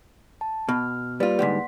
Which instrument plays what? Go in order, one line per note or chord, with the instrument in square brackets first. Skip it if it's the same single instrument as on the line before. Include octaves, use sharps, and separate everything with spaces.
[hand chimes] A5
[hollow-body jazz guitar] B2 [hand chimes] F6
[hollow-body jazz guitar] G3 F4 [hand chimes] A#3 B4 D5
[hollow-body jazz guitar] G#2 D3 G3 [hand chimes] F#5 C6 B6